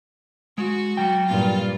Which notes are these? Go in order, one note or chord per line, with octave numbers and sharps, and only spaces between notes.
G#3 F#4
F#3 G5
G2 A#2 F4